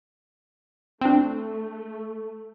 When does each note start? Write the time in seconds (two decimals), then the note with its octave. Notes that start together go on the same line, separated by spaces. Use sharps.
1.01 A3 C4 D4